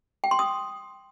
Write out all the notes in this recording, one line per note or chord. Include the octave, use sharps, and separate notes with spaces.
G5
C6
D#6